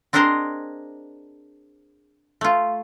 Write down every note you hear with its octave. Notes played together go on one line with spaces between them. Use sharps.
C4 D4 G#4 A#4 C5 D#5
A3 F4